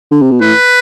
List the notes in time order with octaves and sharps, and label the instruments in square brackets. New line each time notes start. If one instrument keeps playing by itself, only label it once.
[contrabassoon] D3
C3
B2
[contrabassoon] A2 [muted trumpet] B4